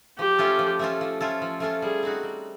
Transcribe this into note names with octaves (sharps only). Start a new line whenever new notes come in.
F3 G4
A3 C#4 F4 A4
F3
A3 C#4 F4 A4
F3
A3 C#4 F4 A4
F3
A3 C#4 F4 A4
G3 G#4
C4 D#4 F#4
G3